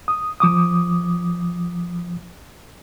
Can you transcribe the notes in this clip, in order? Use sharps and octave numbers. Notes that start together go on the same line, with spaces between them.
D#6
F3 D6 D#6